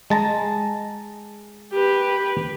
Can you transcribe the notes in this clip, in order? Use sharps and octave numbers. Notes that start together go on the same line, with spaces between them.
G#3 A5 A#5
G4 B4